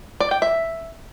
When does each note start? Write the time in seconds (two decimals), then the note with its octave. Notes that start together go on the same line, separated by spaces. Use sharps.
0.20 D5
0.31 G5
0.42 E5